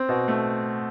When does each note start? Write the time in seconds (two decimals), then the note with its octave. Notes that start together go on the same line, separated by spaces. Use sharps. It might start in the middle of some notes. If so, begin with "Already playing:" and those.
Already playing: C4
0.09 B2
0.28 A3